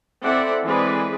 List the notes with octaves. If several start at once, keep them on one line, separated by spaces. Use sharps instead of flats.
C4 E4 A4 D5 E5 F#5
E3 G#3 C4 G#4 B4 D5